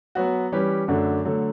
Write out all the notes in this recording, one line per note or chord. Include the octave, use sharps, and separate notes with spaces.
F#3 B3 F#4
E3 G3 C#4 G4 B4
F#2 D3 A3 D4 F#4
D3 F#3 A3